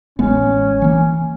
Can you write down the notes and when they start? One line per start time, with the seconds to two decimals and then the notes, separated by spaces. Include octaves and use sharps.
0.19 A1 G#3 B3 C#4
0.82 E3 A#3